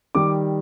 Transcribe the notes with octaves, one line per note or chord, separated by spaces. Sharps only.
D#3 G3 D6